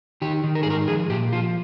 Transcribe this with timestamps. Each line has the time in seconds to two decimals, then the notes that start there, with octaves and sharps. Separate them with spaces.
0.22 D#3 G4
0.44 D#3
0.55 A#4
0.63 G#4
0.66 G#2 A#4
0.88 F3 G#4
1.10 A#2 G4
1.33 F3 F4